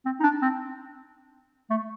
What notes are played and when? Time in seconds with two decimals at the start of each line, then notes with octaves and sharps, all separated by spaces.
0.05 C4
0.20 D#4
0.23 D4
0.42 C4
1.70 A3